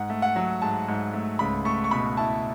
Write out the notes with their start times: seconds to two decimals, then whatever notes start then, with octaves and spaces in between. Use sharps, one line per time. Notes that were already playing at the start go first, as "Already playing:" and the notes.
Already playing: G#2 F#5
0.10 A3
0.22 F#5
0.36 F#3
0.62 G#2 A5
0.88 G#2
1.13 A3
1.39 C#2 B5
1.65 A3 C#6
1.84 C#6
1.91 B2 B5
2.17 E4 A5